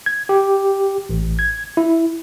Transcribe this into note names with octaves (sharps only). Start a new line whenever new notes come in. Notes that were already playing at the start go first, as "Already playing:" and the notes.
G#6
G4
A1
G#6
E4